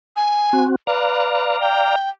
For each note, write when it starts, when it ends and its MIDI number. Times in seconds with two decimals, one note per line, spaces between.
0.16 0.64 80
0.53 0.76 60
0.53 0.76 66
0.87 1.59 71
0.87 1.96 74
0.87 1.96 77
0.87 1.96 82
1.61 2.09 79